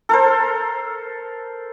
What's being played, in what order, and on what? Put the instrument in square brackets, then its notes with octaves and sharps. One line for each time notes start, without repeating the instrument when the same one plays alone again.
[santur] A4 A#4 C5